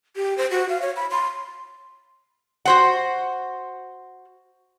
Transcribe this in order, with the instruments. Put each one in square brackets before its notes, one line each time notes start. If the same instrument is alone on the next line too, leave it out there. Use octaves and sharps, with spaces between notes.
[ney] G4
C5
F#4
F5
C#5
B5
C6
[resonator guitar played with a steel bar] F#4 C5 F#5